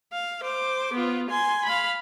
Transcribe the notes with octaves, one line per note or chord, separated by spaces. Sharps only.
F5
C5 D6
B3 F4
G#5 C6
F5 B5